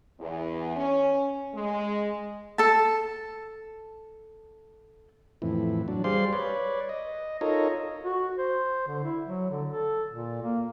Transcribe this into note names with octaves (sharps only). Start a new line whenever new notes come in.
E2
C#4
G#3
A4 A5
F2 A2 E3
F#3 D4
G3 G#4 C5 D5 F5 C6
B4 C#5 D5
D#5
D#4 F4 A4 A#4 C#5 D#5
F#4
C5
D3
E4
F#3
D3
A4
A#2
A#3